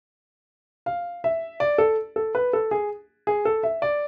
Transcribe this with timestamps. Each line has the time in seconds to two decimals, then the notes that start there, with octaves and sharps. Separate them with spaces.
0.86 F5
1.24 E5
1.60 D5
1.78 A4
2.16 A4
2.35 B4
2.53 A4
2.71 G#4
3.27 G#4
3.45 A4
3.63 E5
3.82 D5